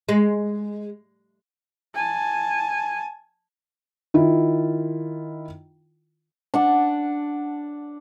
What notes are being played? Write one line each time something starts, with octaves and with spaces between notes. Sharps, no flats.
G#3
G#5 A5
D#3 E4 F4
D4 F#5 A5